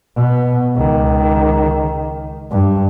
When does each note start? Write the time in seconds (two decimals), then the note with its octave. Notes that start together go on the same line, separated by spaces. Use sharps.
0.16 B2 B3
0.76 C#2 D#3
2.51 G2